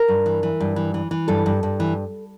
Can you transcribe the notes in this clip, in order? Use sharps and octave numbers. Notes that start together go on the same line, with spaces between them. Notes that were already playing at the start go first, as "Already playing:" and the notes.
Already playing: A#4
G2
E3
E3
G2
E3
E3
E3
G2 A4
G2
G2
E3